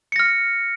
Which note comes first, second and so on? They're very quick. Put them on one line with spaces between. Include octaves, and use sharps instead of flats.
C#7 A#6 F6